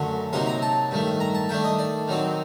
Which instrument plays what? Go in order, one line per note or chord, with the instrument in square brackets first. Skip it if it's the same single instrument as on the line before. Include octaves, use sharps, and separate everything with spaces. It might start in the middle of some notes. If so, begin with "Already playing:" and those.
Already playing: [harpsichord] F#2 D3 F#3 A3 C6
C3 F#3 A#3 D#4 C6
A#5
A5
G2 D#3 A3
A#5
A5
D#3 A3 D4 G5
D#5
D5
D#3 F#3 C4 D#4